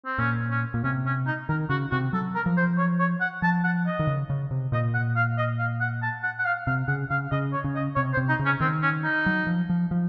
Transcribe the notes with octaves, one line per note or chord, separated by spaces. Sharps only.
C4
A#2 C#4
C#4
A#2
C3 C#4
C#4
D#4
D#3 A#4
C#3 F#4
C3 F#4
F#3 A4
A#4
F3
C5
C#5
C#5
F#5
F3 A5
F#5
D#5
D#3
C#3
C#3
C3
A#2 D#5
F#5
F5
D#5
F5
F#5
A5
F#5
F#5
F5
C3 F5
C#3 F#5
C#3 F5
C#3 D#5
C#5
C#3
D#5
C3 C#5
C5
C3
D#4
C#3
C#4
D#3 C4
C#4
D#4
F#3
F3
F3
F3